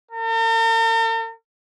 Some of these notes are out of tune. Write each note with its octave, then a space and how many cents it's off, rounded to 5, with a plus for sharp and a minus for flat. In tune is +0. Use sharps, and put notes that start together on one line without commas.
A#4 -45